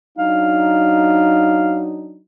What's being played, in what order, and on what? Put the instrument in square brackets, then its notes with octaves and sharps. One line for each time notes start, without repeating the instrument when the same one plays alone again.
[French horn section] F#3 D4 D#4 [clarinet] F5